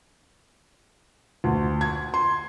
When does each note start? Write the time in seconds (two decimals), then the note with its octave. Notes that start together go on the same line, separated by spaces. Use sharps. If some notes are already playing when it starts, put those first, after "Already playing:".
1.44 D2
1.81 G#6
2.14 C6